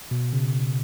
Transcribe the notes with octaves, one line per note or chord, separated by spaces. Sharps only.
B2
C#3